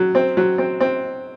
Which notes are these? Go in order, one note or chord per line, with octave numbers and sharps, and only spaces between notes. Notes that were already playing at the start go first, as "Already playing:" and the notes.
Already playing: F#3
C4
F#3
C4
C4